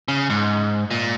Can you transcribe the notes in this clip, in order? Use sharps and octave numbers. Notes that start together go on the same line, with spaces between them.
C#3
G#2
A#2